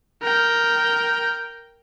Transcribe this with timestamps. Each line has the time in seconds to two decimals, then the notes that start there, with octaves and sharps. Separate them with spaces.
0.22 A#4 G5